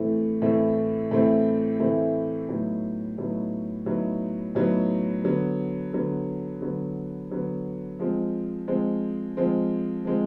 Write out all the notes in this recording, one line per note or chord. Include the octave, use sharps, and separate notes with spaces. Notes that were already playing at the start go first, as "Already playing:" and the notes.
Already playing: A2 E3 A3 C4 E4
A2 E3 A3 C4 E4
A2 E3 A3 C4 E4
A2 E3 A3 C4 E4
A2 F#3 B3 D#4
A2 F#3 B3 D#4
A2 F#3 B3 D#4
A2 F#3 B3 D#4
D3 F#3 B3
D3 F#3 B3
D3 F#3 B3
D3 F#3 B3
F3 G#3 C4
F3 G#3 C4
F3 G#3 C4
F3 G#3 C4